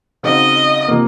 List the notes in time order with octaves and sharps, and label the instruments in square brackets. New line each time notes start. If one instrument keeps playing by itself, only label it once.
[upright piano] C#3 F#3 C4 D#4 [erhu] D#5
[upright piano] C3 F3 A#3